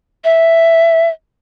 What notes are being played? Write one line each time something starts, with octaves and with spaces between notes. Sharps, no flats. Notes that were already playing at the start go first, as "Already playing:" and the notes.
E5